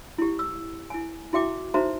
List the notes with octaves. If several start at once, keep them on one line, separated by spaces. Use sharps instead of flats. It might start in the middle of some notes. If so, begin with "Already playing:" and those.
E4 G4
E6
E4 G#5
E4 F#4 E5 G5 D6
D#4 F#4 B4 C5 E5 A#5